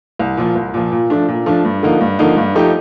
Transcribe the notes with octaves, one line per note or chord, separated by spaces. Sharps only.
C2
A#2 F3
C2
A#2 F3
A#2
F3 A3 D4
A#2
F3 A3 D4
G2
D3 F3 A#3 D#4
G2
D3 F3 A#3 D#4
G2
F3 A3 D#4 G4